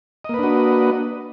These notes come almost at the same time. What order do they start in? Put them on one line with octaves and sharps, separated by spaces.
D#5 A#3 B4 D4 F#4